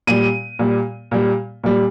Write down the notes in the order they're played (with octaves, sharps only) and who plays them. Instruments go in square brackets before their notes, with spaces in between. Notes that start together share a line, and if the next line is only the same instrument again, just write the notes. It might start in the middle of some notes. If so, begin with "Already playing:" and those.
[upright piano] A#2 G3 D#7
A#2 G3
A#2 G3
A#2 G3